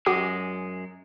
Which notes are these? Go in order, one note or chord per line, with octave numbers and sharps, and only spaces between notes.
F#2 G#3 F#4 F#5 D6